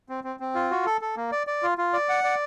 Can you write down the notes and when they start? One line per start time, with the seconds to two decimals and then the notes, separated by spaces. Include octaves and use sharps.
0.09 C4
0.24 C4
0.40 C4
0.55 F4
0.71 F#4
0.86 A4
1.01 A4
1.17 A#3
1.32 D5
1.47 D5
1.63 F4
1.78 F4
1.93 D5
2.09 F#5
2.24 D5